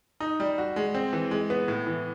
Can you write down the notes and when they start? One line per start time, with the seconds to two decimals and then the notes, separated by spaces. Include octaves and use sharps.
0.20 D#4
0.40 G3
0.58 F#4
0.76 G#3
0.95 C4
1.13 E3
1.31 G#3
1.50 B3
1.68 A2
1.87 E3